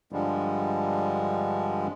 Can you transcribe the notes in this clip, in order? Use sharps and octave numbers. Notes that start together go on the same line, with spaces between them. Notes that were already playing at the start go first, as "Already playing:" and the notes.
G2 D3 F3 G3 G#3